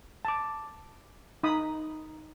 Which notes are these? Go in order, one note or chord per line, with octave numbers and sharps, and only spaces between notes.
A5 D6
D#4 B5 D#6